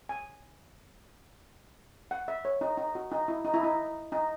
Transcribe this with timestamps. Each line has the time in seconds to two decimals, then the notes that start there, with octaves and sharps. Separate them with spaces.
0.09 G#5
2.11 F#5
2.28 E5
2.45 C#5
2.61 D#4
2.77 D#4
2.95 F#4
3.11 D#4
3.28 E4
3.44 D#4
3.54 E4
3.63 D#4
4.12 D#4